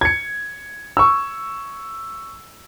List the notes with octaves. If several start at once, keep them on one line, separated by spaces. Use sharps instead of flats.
G#6 C#7
C#6 E6